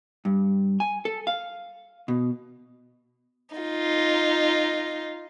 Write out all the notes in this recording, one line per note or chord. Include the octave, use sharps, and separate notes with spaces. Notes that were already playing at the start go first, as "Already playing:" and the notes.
G2
G#5
A4
F5
B2
D#4 F4